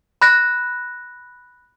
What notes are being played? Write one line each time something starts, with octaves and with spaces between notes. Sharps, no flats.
B5 F#6 A#6